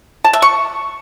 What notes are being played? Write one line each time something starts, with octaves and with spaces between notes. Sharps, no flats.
A5
E5
C#6